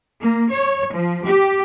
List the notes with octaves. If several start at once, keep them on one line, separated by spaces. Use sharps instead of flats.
A#3
C#5
F3
G4